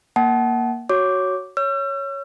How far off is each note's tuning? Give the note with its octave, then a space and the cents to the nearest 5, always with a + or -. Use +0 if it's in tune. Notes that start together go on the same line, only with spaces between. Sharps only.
A#3 +10 F#5 +30 A5 -35
F#4 +10 C#5 +0 D6 -5
C#5 +0 E6 +45